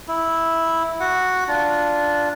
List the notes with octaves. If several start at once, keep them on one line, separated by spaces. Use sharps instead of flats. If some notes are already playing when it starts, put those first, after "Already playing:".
E4
F#4 F#5
D4 F4